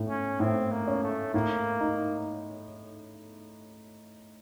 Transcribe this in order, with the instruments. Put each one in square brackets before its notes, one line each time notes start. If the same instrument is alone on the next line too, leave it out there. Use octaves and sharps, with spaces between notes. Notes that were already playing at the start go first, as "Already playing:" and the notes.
Already playing: [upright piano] A2 A3
[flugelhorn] C#4
[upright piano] A2 [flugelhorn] C4
[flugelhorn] A#3
[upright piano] C#4
[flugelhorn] A3
[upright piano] A2 [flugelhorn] A#3
[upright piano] D#4